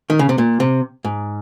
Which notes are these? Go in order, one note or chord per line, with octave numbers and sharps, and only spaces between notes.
D#3
C#3
C3
A#2
C3
G#2